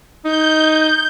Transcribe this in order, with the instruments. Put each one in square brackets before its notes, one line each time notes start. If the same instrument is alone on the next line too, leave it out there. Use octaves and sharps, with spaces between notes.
[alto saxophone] D#4 [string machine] G6